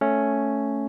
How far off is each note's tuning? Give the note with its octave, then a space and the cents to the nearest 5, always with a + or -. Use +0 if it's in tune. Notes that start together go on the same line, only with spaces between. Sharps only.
A3 +0 C#4 +0